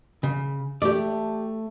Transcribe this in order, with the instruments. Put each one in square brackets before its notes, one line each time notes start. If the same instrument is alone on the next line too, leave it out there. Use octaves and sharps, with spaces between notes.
[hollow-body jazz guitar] C#3
[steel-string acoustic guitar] A3 [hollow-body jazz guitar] G4 D5